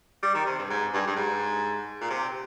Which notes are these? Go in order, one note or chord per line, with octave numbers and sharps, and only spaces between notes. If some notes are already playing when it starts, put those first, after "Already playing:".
G3
D#3
C3
G2
G#2
G2
G2
G#2
A#2
C3